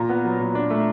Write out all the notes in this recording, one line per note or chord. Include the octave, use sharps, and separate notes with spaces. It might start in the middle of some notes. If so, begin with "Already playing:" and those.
Already playing: A#2 A#5
B3
F#3
A#2
D4
A3